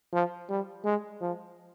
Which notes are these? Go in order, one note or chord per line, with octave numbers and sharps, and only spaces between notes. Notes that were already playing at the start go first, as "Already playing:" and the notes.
F3
G3
G#3
F3